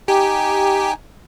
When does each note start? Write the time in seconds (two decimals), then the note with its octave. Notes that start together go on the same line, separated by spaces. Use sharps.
0.08 D#4 G4 G#5